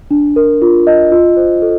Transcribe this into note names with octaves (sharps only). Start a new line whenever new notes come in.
D4
A#4
F4
D#5
F4
C5
A4